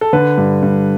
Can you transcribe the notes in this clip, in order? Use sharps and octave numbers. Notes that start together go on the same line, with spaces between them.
A4
D3 B4
G2
G2